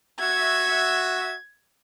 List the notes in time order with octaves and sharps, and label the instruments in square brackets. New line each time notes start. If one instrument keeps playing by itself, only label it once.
[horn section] F#4 E5 [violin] G#6